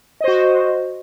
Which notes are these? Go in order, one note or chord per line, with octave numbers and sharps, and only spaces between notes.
F#4 C5 D#5